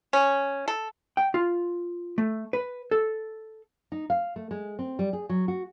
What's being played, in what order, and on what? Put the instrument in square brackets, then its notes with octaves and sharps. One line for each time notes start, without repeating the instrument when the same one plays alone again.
[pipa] C#4
A4
[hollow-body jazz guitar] G5
F4
A3
B4
A4
[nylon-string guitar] D#4
F5
A3
G#3
C4
G3
G#4
F#3
F#4